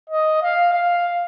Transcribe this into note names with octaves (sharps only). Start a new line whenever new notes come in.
D#5
F5
F5